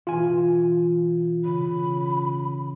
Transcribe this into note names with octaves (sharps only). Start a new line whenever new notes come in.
B2 E3 F4 G#5
C#3 B5